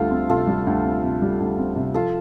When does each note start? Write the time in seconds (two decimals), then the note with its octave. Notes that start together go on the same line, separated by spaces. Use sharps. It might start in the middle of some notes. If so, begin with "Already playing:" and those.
Already playing: D2 G3 F4 A4
0.11 C4
0.29 C3 F4 A4
0.47 G3
0.67 D2
0.85 C4
1.03 C3
1.22 G3
1.40 D2
1.58 C4
1.76 C3
1.94 F3 F4 A4